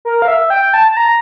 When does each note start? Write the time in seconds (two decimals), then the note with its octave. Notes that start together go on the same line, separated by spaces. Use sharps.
0.05 A#4
0.22 F5
0.28 E5
0.50 G5
0.74 A5
0.91 A5
0.97 A#5